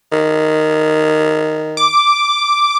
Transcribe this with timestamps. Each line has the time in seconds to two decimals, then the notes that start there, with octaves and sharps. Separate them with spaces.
0.12 D#3
1.77 D6